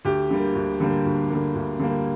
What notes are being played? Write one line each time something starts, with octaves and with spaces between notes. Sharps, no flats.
D2 G4
D3 G3 A#3
D2
D3 G3 A#3
D2
D3 G3 A#3
D2
D3 G3 A#3